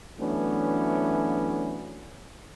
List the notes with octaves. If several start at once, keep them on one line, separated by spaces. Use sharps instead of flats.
E3 F#3 A3 B3 C#4 D4